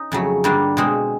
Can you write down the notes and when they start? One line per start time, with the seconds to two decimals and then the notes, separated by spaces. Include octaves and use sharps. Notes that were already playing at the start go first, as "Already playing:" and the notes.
Already playing: C#4 D#4
0.12 F2 C#3 F#3 A3
0.44 G2 D3 G3 A#3 D4
0.77 B2 G#3 C4